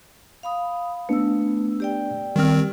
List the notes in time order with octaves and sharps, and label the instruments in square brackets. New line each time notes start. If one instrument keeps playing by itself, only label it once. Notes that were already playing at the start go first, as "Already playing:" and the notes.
[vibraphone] F5 B5 D#6
[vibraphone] A3 E6 [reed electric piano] B3 D4 B4
[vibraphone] G4 D5 G5
[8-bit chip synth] D#3 C4 [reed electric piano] G3 F6